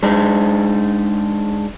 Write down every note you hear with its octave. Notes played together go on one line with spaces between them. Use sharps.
G#3 D4 D#4